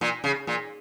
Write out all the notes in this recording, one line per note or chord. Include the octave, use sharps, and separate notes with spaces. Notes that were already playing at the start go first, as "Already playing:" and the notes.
A#2
C#3
A#2